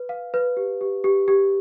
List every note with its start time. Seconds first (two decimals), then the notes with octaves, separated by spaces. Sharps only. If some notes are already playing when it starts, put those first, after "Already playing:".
Already playing: B4
0.09 F5
0.34 B4
0.57 G4
0.81 G4
1.04 G4
1.28 G4